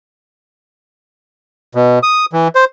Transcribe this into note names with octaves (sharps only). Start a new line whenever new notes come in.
B2
D#6
E3
C5